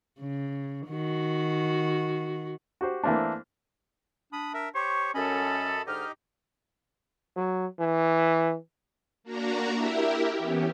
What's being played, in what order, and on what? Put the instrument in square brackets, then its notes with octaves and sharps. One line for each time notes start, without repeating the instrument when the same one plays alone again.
[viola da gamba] C#3
D#3 F#4
[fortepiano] F#4 G4 C5
E3 A3 A#3 C4 D4
[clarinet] D4 [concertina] B5 D#6
[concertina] A#4 E5
[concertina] G4 C5 C#5 [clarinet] C#6
[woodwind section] F#2 A4 [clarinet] C#4 [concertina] D#5 B5
[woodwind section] G#2 D3 F6 [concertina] D#4 G4 D#5
[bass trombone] F#3
E3
[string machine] A#3 D4 F#4 A#5
E4 G4 A#4 E5
E3 B3 C#4 G4